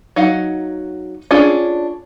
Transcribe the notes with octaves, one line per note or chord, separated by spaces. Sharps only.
F#3 D#4 F5 F#5
C#4 D4 F4 G#4 A4